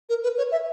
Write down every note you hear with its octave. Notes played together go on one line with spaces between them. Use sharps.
A#4
B4
C#5
E5